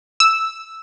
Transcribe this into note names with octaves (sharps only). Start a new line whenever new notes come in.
E6